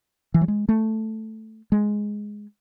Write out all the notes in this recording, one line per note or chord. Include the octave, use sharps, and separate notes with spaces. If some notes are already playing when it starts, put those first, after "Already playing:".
E3
F#3
G#3
A3
G#3